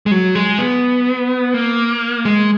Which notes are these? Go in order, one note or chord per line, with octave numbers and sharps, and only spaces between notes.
G#3
F#3
G#3
B3
A#3
G#3